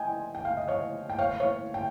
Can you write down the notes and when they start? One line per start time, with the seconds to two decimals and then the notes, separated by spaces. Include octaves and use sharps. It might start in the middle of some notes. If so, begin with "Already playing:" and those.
Already playing: D#5 G5 G#5
0.35 G5
0.45 F5
0.57 D#5
0.67 C#5 F5
1.10 G5
1.19 C#5 F5
1.40 C#5 F5
1.74 G5